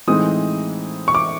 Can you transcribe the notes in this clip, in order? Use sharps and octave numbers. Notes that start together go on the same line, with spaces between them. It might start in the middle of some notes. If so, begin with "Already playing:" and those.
A2 E3 G#3 C4 D#4 D#6
C#6
D6